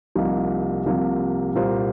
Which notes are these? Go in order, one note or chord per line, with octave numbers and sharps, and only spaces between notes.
C2 C3 F3 A#3 D#4
C2 C3 F3 A#3
C2 A#2 A#3 F4 C5